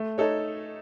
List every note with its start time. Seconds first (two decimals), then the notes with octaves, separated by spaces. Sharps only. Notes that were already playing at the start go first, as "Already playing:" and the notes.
Already playing: A3
0.18 D#4 A4 C#5